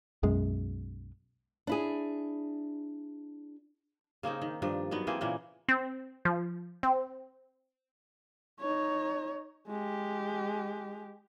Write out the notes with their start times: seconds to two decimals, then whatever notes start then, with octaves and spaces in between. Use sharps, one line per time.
0.23 B1 F#2 G#3
1.67 D4 E4 G#4
4.23 C#3 A#3 C4 D#4
4.41 D#3
4.62 G2 D#3 F3 D4
4.91 D#3 F#3 B3
5.07 E3 A#3 C4 G#4
5.21 A#2 C#3 E3 A#3
5.68 C4
6.25 F3
6.83 C4
8.60 D#4 C#5
9.68 G#3 G4